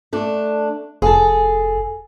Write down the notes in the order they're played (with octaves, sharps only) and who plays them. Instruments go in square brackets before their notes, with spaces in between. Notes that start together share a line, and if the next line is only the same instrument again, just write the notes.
[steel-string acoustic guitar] A3 D4
[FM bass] F1 [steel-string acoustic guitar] G#4 A4